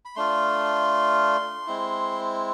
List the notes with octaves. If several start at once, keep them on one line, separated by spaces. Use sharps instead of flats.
B5
A3 D4 F4 C6
G#3 C4 E4